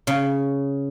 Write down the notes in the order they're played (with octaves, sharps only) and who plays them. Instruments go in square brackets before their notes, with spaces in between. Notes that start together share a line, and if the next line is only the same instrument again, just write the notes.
[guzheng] C#3